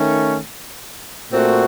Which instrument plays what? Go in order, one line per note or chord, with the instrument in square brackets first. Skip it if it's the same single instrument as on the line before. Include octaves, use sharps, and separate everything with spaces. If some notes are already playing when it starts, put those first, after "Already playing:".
Already playing: [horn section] D#3 A3 C#4
A#2 A3 C4 F#4